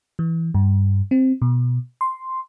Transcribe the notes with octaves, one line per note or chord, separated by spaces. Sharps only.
E3
G2
C4
B2
C6